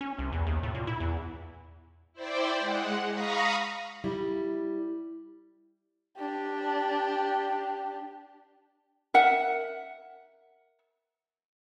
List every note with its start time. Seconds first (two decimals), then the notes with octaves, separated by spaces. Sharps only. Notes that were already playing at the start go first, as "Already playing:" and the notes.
0.01 C#4
0.19 C2
0.32 E2
0.47 D#2
0.63 A2
0.75 A#2
0.87 E4
1.00 E2
2.13 E4 C5 D5 G5
2.59 G#3 F#5
3.11 F5 A#5 B5 C#6 D#6 A#6
4.04 G3 E4
6.18 D4 G4
9.14 A#4 E5 F#5